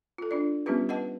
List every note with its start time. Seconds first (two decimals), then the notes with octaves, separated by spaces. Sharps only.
0.18 F4 A4
0.31 D4 F4 D5
0.66 G3 B3 C#4 F4 G4 B4
0.89 B4 D#5 F#5 A5